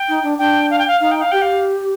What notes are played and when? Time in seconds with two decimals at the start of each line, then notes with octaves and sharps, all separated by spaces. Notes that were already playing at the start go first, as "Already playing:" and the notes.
Already playing: G5
0.09 D#4
0.23 D4
0.39 D4 G5
0.70 F5
0.79 G5
0.88 F5
1.01 D#4 F5
1.11 G5
1.21 F5
1.32 G4 G5
1.42 F5